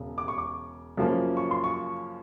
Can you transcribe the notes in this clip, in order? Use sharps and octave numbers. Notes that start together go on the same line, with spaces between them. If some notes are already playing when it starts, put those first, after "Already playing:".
Already playing: E1 C#3
D6
C#6
D6
F#2 C#3 F3 A#3
C#6
C6
C#6